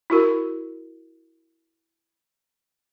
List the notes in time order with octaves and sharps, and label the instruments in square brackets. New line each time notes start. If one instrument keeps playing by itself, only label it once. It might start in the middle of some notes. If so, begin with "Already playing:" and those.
[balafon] E4 F#4 A#4